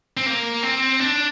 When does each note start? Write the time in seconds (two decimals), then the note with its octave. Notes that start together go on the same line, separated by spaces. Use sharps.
0.17 C4
0.26 A#3
0.63 C4
1.00 D4